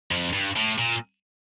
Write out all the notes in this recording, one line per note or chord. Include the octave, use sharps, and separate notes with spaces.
F2
G2
A2
A#2